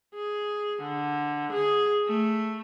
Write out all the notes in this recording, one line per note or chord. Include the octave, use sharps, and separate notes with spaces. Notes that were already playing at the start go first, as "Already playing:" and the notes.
G#4
D3
G#4
A3